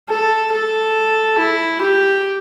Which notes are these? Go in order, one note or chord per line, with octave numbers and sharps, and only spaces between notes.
A4
A4
E4
G4